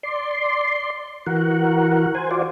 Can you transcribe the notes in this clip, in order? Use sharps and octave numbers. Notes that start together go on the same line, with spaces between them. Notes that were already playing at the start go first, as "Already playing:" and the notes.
D5 C6
E3 F#4 A#4 F#5
C5 G#5
F4 F#4 C5 D5